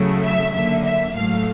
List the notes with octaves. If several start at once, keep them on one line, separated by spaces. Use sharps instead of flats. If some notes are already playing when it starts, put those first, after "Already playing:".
Already playing: C#3 F#3 A3
E5
D3 F#3 A#3 E5
E5
A2 F#3 A3 F5